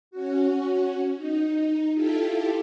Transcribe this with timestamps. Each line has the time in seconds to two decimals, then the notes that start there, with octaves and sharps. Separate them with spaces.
0.11 C#4 F#4
1.15 D#4
1.94 E4 F4 G4 A4